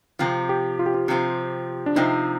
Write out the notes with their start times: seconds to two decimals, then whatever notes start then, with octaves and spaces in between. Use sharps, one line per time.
0.19 C3 F3 C4
0.49 G4
0.79 F4
0.86 G4
0.94 F4
1.08 C3 F3 C4
1.86 D4
1.96 C3 F3 C4 D#4